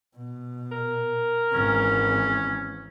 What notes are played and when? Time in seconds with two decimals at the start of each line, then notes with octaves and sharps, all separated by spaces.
0.17 B2
0.72 A#4
1.53 G#1 E3 C#4